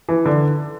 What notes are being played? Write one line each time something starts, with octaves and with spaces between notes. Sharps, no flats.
E3
D3